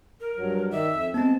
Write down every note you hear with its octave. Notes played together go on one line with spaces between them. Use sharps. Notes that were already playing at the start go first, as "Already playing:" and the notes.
A#4
G2 F#3
D#3 D#4 D5 E5
F2
G#3 B3 C4 A5